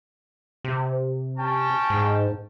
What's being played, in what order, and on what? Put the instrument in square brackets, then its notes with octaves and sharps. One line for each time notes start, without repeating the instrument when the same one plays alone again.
[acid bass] C3
[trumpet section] C#4 G5 A5
[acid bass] G#2